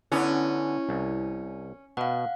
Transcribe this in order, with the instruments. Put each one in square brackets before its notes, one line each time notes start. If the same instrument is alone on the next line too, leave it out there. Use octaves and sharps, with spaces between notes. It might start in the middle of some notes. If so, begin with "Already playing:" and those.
[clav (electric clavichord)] D3 B3 [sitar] C#4 [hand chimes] E4 C#5
[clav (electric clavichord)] C2
[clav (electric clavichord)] B2 [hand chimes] F5 F#5